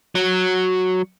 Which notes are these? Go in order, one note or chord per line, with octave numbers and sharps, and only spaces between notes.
F#3